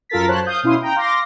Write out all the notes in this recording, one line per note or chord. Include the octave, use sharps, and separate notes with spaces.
F#2 F4 A4 A#4 A6 B6
F#2 C5 C#5 A5 F#6
F5 D#6 G6
B2 C#4 E4 F5 C6 D#6
G5 A#5 G6
F5 C6 D6 A#6